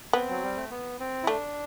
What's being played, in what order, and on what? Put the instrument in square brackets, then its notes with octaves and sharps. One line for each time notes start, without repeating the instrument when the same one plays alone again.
[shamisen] B3 [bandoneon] C4
[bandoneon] F#3
G3
A3
B3
C4
E4
[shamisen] A3 [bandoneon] D4